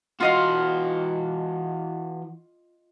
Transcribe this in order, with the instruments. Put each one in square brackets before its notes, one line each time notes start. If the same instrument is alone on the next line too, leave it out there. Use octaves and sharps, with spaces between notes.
[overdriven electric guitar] E3 F#4 [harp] F4 D#5 F5